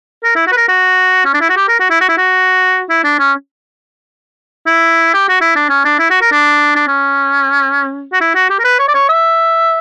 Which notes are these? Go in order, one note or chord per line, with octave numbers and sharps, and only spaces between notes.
A#4
E4
F#4
B4
A#4
F#4
C#4
D4
E4
F#4
G4
A#4
F#4
E4
F#4
E4
F#4
E4
D4
C#4
E4
G4
F#4
E4
D4
C#4
D4
E4
F#4
A#4
D4
D4
C#4
F#4
E4
F#4
G4
A#4
B4
C#5
D5
C#5
E5